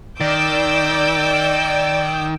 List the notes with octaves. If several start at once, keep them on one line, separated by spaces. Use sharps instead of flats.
D#3 D5 D6 E6 G6